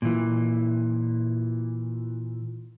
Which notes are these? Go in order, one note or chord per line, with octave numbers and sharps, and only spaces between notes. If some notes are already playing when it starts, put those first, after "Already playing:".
A#2 E3